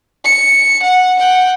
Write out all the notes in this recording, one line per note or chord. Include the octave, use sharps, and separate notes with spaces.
C#7
F#5
F#5 G5